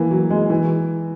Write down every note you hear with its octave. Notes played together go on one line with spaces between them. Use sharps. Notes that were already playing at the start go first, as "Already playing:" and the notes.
Already playing: E3 A#3
F#3
G#3
E3